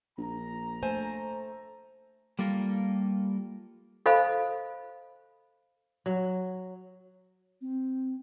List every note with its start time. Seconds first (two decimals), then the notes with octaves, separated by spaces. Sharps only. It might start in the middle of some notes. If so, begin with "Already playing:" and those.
0.18 A#1 A#5
0.82 A3 C5 G#5
2.39 G3 A#3 F4 A4 A#4
4.06 A4 C5 D#5 F5 G#5 B5
6.06 F#3
7.61 C4